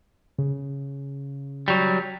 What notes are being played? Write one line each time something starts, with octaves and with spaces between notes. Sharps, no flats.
C#3
F#3 G3